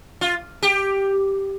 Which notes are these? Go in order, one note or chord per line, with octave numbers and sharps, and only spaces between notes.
F4
G4